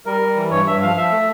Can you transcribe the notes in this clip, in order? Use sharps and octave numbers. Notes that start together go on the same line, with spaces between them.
G3 A#4
G3
E3
G2 C#5
G2 E5
F3 F5
F3 E5
A3